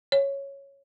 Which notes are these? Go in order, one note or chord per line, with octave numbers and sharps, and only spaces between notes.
C#5